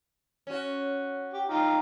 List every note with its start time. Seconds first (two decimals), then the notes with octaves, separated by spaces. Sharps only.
0.47 C#4 F#4
1.34 G4
1.49 D#4 F4 G4